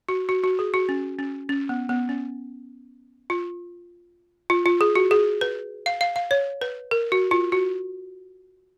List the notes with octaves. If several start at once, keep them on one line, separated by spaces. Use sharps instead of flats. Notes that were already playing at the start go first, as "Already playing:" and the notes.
F#4
F#4
F#4
G#4
F#4
C#4
C#4
C#4
B3
B3
C#4
F4
F4
F4
G#4
F#4
G#4
B4
F5
F5
F5
C#5
B4
A#4
F#4
F4
F#4